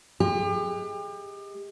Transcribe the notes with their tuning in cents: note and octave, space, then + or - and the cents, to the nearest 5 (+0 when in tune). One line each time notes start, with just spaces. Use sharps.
G#3 +20 G4 +35